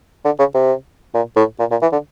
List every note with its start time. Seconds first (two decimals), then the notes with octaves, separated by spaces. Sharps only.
0.25 D3
0.39 C#3
0.55 C3
1.14 A#2
1.36 A2
1.59 A#2
1.71 A#2
1.82 E3
1.92 D3